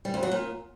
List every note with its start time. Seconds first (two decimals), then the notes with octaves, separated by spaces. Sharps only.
0.05 G3
0.14 F2
0.23 F#3
0.32 A#2